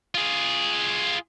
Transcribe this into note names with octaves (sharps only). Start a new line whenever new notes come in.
F4 G#4